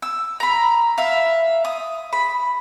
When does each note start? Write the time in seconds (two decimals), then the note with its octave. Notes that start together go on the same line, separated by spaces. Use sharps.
0.02 E6
0.40 A#5 B5
0.98 E5 F5
1.65 D#6
2.13 B5